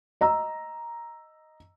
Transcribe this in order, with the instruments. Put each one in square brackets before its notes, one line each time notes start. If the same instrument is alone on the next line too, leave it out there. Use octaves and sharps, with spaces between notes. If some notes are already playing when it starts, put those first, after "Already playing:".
[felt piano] D#5 A#5 E6